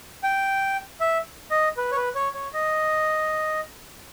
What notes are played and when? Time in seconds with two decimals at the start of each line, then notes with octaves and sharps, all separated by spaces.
0.24 G5
1.00 E5
1.51 D#5
1.77 B4
1.92 C#5
1.96 B4
2.15 C#5
2.34 C#5
2.53 D#5